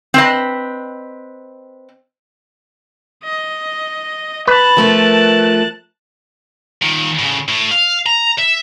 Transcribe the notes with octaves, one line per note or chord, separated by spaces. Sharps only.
C4 B4 D#5
D#5
B4 A5 F#6
F3 A3 A#4
A#2 D#3
A2 C#3
A2
F5
A#5
E5